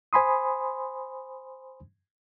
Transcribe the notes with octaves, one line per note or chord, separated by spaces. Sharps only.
C5 G#5 B5 C6 D#6